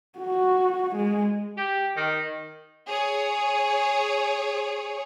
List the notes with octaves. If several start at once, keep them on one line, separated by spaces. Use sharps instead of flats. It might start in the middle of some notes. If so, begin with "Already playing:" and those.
F#4
G#3
G4
D#3
G#4 C#5